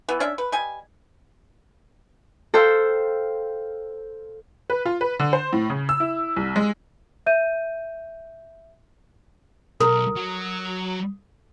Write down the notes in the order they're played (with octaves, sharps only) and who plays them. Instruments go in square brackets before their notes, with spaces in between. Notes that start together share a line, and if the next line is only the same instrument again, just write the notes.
[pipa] E3 B3
C#4 D4 D5 E5
B4
G3 D#5 G#5
[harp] A4 C5 F5 G5 E6
[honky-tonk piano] B4
F4
B4
D3
C5
A2
C#3
E6
E4
C2
G#3
[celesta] E5 G6 D#7
[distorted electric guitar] B1 [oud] A#4 [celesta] D#6
[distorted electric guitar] F#3